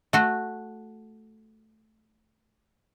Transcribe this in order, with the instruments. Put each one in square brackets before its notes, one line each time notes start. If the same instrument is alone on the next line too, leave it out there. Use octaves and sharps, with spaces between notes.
[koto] A3 F#4